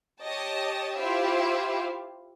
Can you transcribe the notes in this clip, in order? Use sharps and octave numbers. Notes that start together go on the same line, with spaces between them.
G4 C#5 D#5 A5
E4 F4 G4 C5 E5 F5